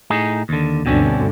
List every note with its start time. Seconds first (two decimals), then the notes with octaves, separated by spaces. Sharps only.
0.10 A2 D#4 G#4
0.49 D#2 D3
0.86 D2 G2 B2 D3 C4 C#4